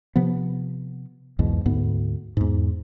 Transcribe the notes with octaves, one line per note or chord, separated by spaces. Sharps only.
C3 F3 B3
B1 E2 G#2 B2
D2 G#2 B3
E2 G#2